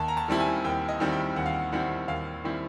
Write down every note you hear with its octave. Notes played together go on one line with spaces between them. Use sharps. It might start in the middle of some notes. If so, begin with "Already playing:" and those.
Already playing: D#2 A5
A#5
A5
D#3 G3 C4 E4
G#5
D#2 G5
D#5
D#3 G3 C4 E4
G5
D#2 F#5
F5
F#5
D#3 G3 C4 E4 F#5
D#2 F5
D#3 G3 C4 E4